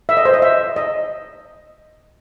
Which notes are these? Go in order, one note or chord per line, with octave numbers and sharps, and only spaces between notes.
E5
D#5
C5
D#5
E5
D#5